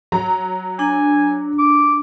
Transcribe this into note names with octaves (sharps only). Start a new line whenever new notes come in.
F#3 A#5
D4 G#5
D6